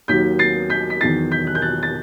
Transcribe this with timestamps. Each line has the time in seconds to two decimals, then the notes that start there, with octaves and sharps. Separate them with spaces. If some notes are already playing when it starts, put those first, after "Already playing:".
0.08 D#2 D#3 F#3 G6 B6
0.39 A6 C7
0.70 G6 B6
0.90 B6
1.01 E2 D#3 F#3 A6 C7
1.31 G6 B6
1.47 F#6
1.55 G6
1.62 F#6 A6
1.83 A6